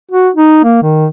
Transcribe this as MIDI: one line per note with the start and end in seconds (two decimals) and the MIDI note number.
0.11 0.29 66
0.35 0.62 63
0.64 0.82 58
0.83 1.07 51